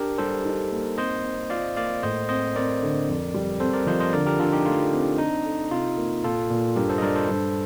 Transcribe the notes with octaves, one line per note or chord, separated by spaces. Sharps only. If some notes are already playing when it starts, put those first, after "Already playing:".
Already playing: D4 G4 A#4
G3 A4 C5
D#4
A#3
C4 C5 D#5
C4
F4 D5 F5
A#3 D5 F5
A2 C5 D#5
C4 C5 D#5
C4 A#4 D5
D3
F2
G3
C4 A4 C5
A#4 D5
F3 C5 D#5
C5 D#5
D3 A#4 D5
G4 A#4
D3 F4 A4
D#4 G4
A3 F4
C4
D4 D#4
A4
C3 F4
A#3
A#2 F4 A4
A#2
G2 G4 A#4
A4 C5
D#5
G2 A#4 D5
A4 C5
G2